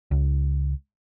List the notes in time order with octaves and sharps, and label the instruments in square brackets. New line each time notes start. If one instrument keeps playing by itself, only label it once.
[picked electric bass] C#2